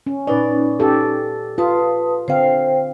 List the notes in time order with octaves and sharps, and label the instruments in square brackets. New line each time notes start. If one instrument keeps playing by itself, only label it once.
[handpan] C#4
[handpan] A#2 B4 D5 [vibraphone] C#4 D#4
[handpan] G4 A4
[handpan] F4 [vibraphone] B4 A5 D#6
[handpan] D3 C4 F5 [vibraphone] C5 G5